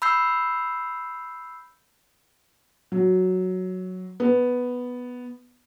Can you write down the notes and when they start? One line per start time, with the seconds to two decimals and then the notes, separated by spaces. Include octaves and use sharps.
0.02 B5 E6 G6 C7
2.92 F#3
4.20 B3